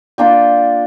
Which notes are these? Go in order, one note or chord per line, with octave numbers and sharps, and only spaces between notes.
A#3 D4 F4 G5